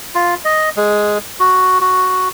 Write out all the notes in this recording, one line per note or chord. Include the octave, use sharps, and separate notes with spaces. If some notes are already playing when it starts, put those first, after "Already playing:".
F4
D#5
G#3
F#4
F#4